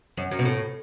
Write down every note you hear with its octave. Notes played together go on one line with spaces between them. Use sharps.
F#2
F#2
B2
A2